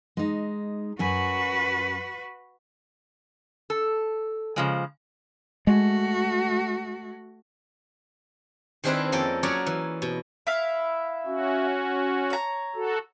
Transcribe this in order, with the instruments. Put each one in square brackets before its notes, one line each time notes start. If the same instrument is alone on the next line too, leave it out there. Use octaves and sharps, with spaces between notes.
[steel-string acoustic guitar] G#3 D#4
[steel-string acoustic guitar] F#2 G#5 [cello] F#4 B4
[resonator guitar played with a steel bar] A4
C#3 F3 G#3
[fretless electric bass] G#3 [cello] A3 F#4
[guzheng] D#3 G#3 C4 D4 E4 B4
F2 A#3 C#4 A4 G5
F#3 C#4 G#4 A#4 C#5 D5
E3
B2
[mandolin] E4 E5 F5
[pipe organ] C#4 F#4
[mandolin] C#5 A#5
[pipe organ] F#4 A4